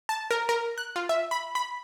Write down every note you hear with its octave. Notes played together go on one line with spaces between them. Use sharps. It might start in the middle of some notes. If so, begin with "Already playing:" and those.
A5
A#4
A#4
F#6
F4
E5
B5
B5